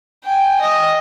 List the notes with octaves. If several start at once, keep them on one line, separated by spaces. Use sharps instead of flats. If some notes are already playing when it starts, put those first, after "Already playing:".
G5 G#5
D#5